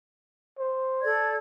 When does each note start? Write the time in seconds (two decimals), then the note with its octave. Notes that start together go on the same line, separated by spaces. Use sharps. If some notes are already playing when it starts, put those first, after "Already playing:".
0.59 C5
1.02 A4 D5 G#6